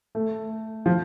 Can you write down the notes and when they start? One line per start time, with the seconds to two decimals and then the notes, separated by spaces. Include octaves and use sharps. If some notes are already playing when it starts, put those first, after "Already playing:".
0.15 A3
0.86 F3